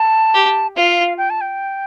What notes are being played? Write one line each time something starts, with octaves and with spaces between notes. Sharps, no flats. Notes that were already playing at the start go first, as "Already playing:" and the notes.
Already playing: A5
G4
F4 F5
G5
A5
G5